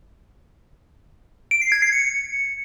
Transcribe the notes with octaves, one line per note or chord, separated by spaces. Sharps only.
D7
C7
G#6
C7
C#7